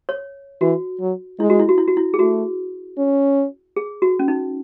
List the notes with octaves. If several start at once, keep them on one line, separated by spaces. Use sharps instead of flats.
C#5
E3 F#4
F#3
G#3 E4
F#4
E4
F#4
E4
F#4
E4
G#4
A3 F#4
C#4
G#4
F#4
C#4
D#4